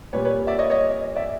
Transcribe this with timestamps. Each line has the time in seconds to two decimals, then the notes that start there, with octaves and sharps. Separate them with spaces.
0.13 A#2 G3 B4 C#5
0.25 B4 C#5
0.47 D5 E5
0.59 C#5 D#5
0.70 C#5 D#5
1.16 D5 E5